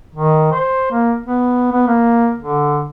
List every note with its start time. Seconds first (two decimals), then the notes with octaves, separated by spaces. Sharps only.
0.15 D#3
0.52 C5
0.92 A#3
1.26 B3
1.72 B3
1.88 A#3
2.38 D3